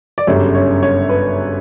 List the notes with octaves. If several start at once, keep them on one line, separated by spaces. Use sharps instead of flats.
D5
G1 F#2 C#3 G3 C#5
C#5
C#5
B4